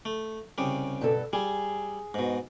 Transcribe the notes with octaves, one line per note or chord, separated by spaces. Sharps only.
A3
C2 C#3 G4
G2 B2 A4
G3 G#4
G#2 B2